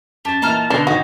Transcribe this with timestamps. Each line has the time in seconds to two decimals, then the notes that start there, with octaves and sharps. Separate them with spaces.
0.25 F#2 G4 A5
0.42 A#2 E3 D#5 A#5 F6
0.70 B2 D3 C#4 D4 A#4 C6
0.87 G#1 D#4 F#4 G4